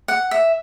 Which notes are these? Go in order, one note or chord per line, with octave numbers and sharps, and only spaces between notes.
F#5
E5